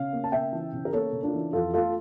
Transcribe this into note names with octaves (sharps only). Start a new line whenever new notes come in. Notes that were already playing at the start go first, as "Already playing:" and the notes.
Already playing: C#3 F5
A#3
A5
C#3 E5 G5
E3
C#3
A#4
A#3 A4 C#5
C#3
D4 F4
E3
F2 F4 A4
A3 F4 A4